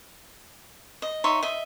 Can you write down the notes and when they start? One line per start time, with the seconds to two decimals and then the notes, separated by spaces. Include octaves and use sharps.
1.02 D#5
1.24 D#4 C#5 E5 C6
1.43 D#5 E5